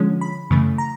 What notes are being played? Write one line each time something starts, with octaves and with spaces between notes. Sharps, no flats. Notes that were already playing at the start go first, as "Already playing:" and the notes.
Already playing: D3 F3 G#3 C#4
B5
F#2 C#3 E3 A3
A#5